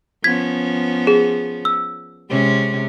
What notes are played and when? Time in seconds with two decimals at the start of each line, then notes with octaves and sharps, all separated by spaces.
0.24 F3 B3 C#4 G#6 B6
1.07 G#4
1.65 E6
2.30 C3 G#3 C#4